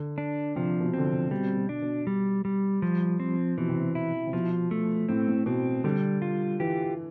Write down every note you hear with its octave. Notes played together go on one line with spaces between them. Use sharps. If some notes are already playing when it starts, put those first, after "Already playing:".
Already playing: D3
D4
C3 F3
B2
D3 C4
C3
B2 G3
B2
D4
B2
G3
G3
F3
C4
B2 E3
C3
B2
E4
C3
B2 F3
A3
A2 C4
A2
B2 C4
D3 G3
F4
E3 G4